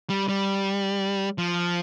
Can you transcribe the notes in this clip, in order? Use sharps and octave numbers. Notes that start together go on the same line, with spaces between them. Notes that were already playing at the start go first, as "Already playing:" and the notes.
G3
G3
F3